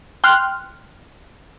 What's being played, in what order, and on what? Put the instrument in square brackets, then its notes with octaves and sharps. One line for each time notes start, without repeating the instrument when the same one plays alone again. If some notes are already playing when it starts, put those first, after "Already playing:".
[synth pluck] G5 C6 F6 F#6